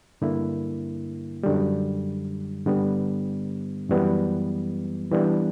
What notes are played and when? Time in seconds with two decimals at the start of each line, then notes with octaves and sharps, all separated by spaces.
0.21 G2 D3 A#3 E4
1.43 F#2 D3 G3
2.66 G2 D3 G3 B3
3.89 F#2 E3 G3 B3
5.12 E3 G3 B3 D4